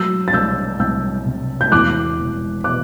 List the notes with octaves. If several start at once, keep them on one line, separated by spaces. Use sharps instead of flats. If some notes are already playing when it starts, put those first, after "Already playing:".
Already playing: F#3 E6 G6
A6
C2 E6 G6
C2 E6 G6
C3
G6
E2 D6 F#6
E1
B2 D6 F#6